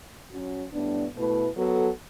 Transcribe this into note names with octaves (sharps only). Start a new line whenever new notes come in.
F#3 C#4 F#4
A2 G3 B3 D4
B2 A3 E4 B4
F#3 B3 F#4 A4